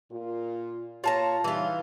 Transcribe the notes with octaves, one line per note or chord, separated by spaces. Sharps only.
A#2 F4
A#2 F4 C#5 A5 A#5
C#3 E3 G3 D#4 F4